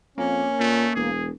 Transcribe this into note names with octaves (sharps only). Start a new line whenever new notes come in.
F2 A#3 C#4
A#2 A3
E1 G#4